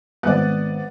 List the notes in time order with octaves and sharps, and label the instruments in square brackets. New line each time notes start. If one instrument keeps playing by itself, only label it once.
[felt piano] G#1 F#6 [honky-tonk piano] B3 D5